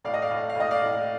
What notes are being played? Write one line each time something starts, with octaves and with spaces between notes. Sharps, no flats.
A2 D5 F5
D#5
D5 F5
A2
F5
A2 D#5
D5 F5
A2